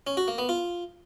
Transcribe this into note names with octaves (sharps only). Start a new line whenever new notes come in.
C#4
F#4
A#3
B3
F4